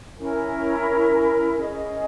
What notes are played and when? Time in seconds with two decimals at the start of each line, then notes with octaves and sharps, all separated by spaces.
0.19 C#4 E4 A#4
1.56 C#4 G#4 D#5